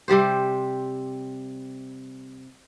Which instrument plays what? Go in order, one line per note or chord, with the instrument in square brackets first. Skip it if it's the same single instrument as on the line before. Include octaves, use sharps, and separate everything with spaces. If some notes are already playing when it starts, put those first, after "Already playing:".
[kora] C3 G3 G4 C5